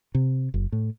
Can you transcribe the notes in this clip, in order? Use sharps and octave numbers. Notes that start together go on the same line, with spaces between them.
C3
F#1
A2